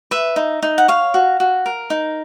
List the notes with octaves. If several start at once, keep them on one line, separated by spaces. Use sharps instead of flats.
B4 E5
D#4
D#4
F#5
C#5 F5
F#4
F#4
A#4
D#4